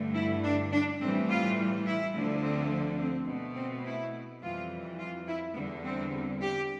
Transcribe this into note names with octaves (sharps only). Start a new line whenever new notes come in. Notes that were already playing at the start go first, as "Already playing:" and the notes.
Already playing: G2 D3 A3
E4
D4
D4
A2 E3 G3 C4
F4
E4
D2 D3 F3 A3
C4
C4
B2
A3
C4
E4
F2 E3 G3 F4
F4
E4
E2 D3 G3 B3
C4
G4